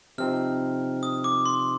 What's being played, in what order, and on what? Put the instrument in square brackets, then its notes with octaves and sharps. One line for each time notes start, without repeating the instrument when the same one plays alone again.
[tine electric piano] C3 F3 C4 D#4 [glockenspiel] F6
[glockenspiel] D#6
D6
C6